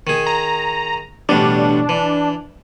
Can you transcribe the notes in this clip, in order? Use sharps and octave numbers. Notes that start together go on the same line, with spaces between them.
D#3 G#4
A#5
A1 B2 G3 D4
E3